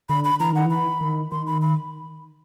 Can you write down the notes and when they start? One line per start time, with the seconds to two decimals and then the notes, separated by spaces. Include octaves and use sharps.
0.09 D3 B5
0.25 B5
0.40 E3 A#5
0.52 D#3 F#5
0.65 E3 B5
1.01 D#3
1.31 D#3 C6
1.47 B5
1.62 B5